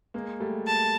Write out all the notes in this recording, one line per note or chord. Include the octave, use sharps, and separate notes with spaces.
G#3 A#3
G3 A3
A5